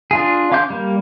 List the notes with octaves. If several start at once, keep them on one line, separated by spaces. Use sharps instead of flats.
D4 F4 G#4
C#4 F5 C6 D6 G6
G3 A#3